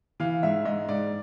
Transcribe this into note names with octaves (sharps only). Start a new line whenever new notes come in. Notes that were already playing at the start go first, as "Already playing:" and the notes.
E3 F5
G#2 E5
G#2 D#5
G#2 D5